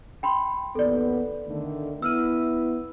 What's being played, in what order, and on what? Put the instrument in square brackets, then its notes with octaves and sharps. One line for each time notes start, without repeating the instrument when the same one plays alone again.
[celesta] G5 B5 C6
[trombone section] A1 D#2 B3 [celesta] A4 D5
[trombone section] D3 D#3 A3
[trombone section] B3 E4 [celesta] E6 F6 D#7